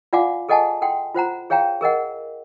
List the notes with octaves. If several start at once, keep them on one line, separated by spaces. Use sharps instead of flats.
F4 D5 F5 F#5 G#5 D6
G#4 A4 D#5 F#5 G#5 A5
A4 F#5 G5 C6
F4 C5 F#5 A#5
G#4 C#5 F5 G5 A#5
G#4 A#4 D#5 F#5